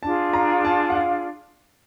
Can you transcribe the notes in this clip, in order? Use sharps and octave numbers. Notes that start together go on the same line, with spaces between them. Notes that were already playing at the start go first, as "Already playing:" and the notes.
D4 F4 G#4 A5
A#5
A5
F#5
F5